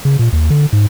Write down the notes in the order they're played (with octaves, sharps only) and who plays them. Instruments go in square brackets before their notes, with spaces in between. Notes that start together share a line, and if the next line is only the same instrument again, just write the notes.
[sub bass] C#3
A#2
D#2
D3
G#2